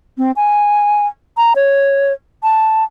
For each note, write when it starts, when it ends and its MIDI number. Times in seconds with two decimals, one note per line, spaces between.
0.18 0.31 60
0.36 1.06 80
1.37 1.53 82
1.56 2.13 73
2.43 2.84 81